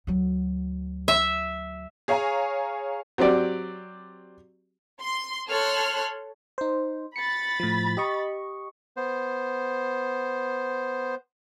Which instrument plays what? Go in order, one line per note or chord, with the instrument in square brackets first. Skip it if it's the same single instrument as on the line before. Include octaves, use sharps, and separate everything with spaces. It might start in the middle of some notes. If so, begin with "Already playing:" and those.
[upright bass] D2 F#3
[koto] E5
[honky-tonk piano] G#4 C#5 F5 G#5 A#5
[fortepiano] F#3 C4 G4 D5
[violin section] C6
A4 C#5 C6 F6 F#6
[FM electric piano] D#4 C5
[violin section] B5 A6 [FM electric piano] C#7
[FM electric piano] A2 F3
G4 D#5 C#6
[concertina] B3 C5